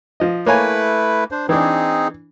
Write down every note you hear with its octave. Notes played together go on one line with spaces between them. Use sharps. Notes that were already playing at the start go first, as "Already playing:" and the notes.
F3 D#5
A3 A#3 E4 B4 C#5 G#5
D4 C5
E3 C4 D4 D#4 G#4